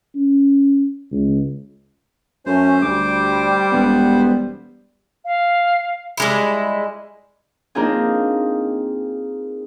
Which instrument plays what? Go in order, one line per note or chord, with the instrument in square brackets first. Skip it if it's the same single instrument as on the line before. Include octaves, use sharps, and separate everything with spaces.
[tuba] C#4
C#2
[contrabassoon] F#2 [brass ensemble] A3 C#4 [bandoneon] C5
[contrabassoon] D2 [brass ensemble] G3 [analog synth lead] D6
[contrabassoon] E1 [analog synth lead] B3
[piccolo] F5
[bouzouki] G3 G#3 E4
[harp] A#3 C4 D4 D#4 F4 G#4